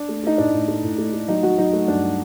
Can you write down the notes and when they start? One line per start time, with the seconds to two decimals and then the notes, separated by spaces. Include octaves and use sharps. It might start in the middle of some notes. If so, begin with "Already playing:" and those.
Already playing: D4
0.08 A3
0.23 A3 D#4
0.38 A2 D4
0.53 A2
0.68 A3
0.83 A2
0.98 A3
1.13 A3
1.28 F#3 D#4
1.43 F#3 F#4
1.58 F#3 D#4
1.73 A3
1.88 G2 D4